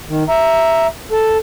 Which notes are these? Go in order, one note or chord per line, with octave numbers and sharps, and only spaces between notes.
D#3
E5 A#5
A4